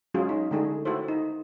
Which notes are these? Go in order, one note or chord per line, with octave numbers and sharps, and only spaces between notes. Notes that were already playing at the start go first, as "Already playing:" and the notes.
F#3 G#3 C#4 F4 F#4 G#4
D#4
D3 G#3 A3 D#4 G#4
A3 E4 F#4 A4 C5
D#4